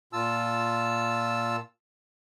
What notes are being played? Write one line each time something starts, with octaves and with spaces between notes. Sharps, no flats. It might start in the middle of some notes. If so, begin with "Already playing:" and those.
A#2 F4 A5 E6